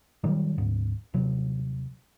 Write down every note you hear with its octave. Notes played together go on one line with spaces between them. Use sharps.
A#2 D#3 F#3 G3
D2 G#2
D#1 C3 F#3